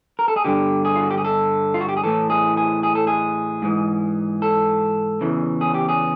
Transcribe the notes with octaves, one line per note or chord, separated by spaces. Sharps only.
A#4
A4
G#4
G2 D3 G4
G#4
F4
F#4
G4
G#4
A4
F4
F#4
G4
G#4
A2 E3 A4
G#4
G#4
G#4
A4
G#4
G#2 E3
A4
E2 C#3 E3
G#4
G4
G#4